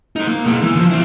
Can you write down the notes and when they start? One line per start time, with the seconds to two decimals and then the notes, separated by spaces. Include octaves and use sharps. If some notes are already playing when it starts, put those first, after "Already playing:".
0.16 G#3 D#4
0.28 A#3
0.46 B2 G#3
0.62 E3
0.76 D3 F3
0.90 C4 E4